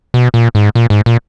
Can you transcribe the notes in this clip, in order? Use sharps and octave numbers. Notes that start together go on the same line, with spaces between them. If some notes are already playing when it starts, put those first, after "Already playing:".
B2
A#2
G#2
A#2
G#2
A#2